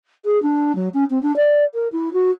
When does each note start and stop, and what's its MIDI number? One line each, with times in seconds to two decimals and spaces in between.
0.25 0.41 68
0.42 0.74 62
0.75 0.88 54
0.93 1.04 61
1.10 1.20 60
1.22 1.34 62
1.36 1.64 74
1.74 1.88 70
1.92 2.12 64
2.13 2.30 66